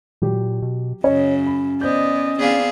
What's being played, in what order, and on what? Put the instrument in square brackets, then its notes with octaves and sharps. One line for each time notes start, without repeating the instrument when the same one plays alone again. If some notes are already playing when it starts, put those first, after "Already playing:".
[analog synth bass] A#2 [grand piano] F#3 G4
[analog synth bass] B2
[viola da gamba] F#2 C#3 [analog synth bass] C#4 [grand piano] C#5 D#5
[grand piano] B5
[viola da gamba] B3 [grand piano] C5 G6 [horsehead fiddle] D5 D#5
[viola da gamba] B3 C4 G#4 [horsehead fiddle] D5 F5